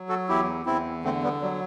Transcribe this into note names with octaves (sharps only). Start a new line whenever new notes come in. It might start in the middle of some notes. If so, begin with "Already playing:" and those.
Already playing: F#3
F#4 A4
E2 E4 G4
E2 C4 E4
D3 A3 C4
G3 B3
F#3 G3